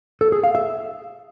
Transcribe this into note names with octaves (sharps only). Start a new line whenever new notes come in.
A4
G#4
F5
E5